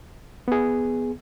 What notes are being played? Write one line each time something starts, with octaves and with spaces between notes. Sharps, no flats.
B3 G#4